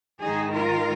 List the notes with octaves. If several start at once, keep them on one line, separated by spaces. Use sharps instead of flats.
G#2 D#3 D#4 G#4
F4 A#4